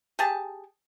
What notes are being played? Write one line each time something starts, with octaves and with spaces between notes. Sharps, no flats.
G4 G#4 A5